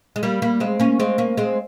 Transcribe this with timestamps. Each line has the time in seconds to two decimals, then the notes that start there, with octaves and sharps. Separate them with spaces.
0.16 G#3
0.23 G3 A#3
0.42 G3 A#3
0.60 G#3 C4
0.80 A#3 C#4
1.00 G#3 C4
1.18 A#3 C#4
1.37 G#3 C4